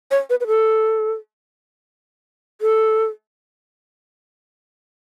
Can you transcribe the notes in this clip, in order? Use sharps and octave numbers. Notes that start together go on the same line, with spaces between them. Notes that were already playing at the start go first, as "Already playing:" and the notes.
C#5
B4
B4
A4
A4